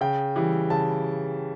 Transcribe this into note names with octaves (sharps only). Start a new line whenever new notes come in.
C#3 G5
E3 G3
C#3 A5